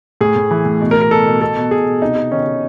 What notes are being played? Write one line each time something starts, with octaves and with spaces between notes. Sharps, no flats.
A2 G#4
A2
E3
A2
B2
A#4
B2
A#4
B2 A4
B2
B2 A4
B2
B2 G#4
B2
C3 D#4
C3
D#3 C#4
D#3